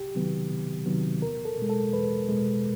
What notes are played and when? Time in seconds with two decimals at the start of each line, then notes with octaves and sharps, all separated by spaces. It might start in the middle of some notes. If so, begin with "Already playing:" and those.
Already playing: C2 G4
0.15 C3 D#3 F#3 B3
0.50 C2
0.86 C3 D#3 F#3 B3
1.21 E2 A#4
1.45 A4
1.57 B2 G#3
1.70 A4
1.93 E2 B4
2.29 B2 G#3